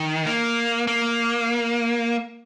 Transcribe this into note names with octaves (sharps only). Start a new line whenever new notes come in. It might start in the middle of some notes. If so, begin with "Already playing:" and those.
Already playing: D#3
A#3
A#3